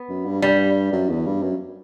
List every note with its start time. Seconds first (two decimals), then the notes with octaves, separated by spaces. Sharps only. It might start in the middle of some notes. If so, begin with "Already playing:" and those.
Already playing: B3
0.09 F#2
0.26 G2
0.42 G2 G3
0.93 F#2
1.09 E2
1.26 G2
1.42 F#2